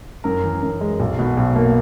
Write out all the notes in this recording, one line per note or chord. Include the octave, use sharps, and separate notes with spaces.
F#2 A#4
E3
F#2
G#3
B1
B2
B1
A#3